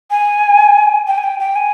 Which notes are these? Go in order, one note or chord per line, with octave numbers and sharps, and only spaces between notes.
G#5
G5
G#5
G5
G5
G#5